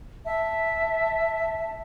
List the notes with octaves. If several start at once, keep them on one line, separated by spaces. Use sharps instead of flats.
E5 A5